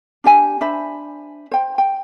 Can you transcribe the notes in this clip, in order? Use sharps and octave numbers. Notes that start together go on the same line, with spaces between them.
D4 G4 G#5
D4 C5 E5 B5
C5 G5
G5